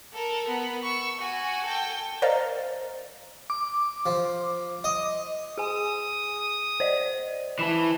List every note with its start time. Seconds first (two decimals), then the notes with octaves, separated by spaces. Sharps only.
0.13 A4 A#4
0.48 B3
0.83 C#6 E6
1.18 F#4 G#5
1.64 A4 G5
2.22 A#4 C5 D5 D#5 F5 A#5
3.50 D6
4.06 F3
4.84 D#5
5.58 G#4 G#5 D#6
6.80 C5 D5 D#5
7.59 E3 E4 A5 B5 E7